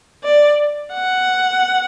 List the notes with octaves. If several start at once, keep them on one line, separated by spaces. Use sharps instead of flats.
D5
F#5